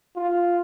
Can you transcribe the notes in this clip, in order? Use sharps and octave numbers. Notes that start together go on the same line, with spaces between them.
F4